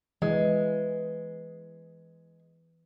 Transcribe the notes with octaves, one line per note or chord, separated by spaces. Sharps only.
E3 G#3